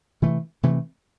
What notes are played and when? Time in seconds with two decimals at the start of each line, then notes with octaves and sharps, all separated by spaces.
0.22 C3 E3 A3
0.63 C3 E3 A3